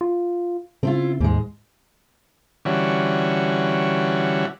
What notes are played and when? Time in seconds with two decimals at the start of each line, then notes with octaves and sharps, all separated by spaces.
0.01 F4
0.83 C#3 C4 E4 F4
1.21 D#2 G#2 G#3
2.65 D3 E3 G3 C#4 F#4